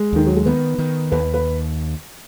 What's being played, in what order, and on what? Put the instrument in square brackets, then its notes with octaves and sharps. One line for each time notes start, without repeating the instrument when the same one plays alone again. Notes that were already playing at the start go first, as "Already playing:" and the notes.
Already playing: [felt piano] G#3
[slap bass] D#2 [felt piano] D#3
[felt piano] F#3
G#3
[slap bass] D#3 [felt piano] B3
[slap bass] D#3
[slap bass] D#2 [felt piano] B4
[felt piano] B4